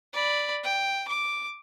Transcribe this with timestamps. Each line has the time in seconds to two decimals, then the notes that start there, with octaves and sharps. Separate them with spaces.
0.13 D5 B5
0.63 G5
1.08 D6